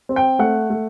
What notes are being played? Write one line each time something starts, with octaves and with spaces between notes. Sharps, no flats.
C4
G5
A3 F#5
A3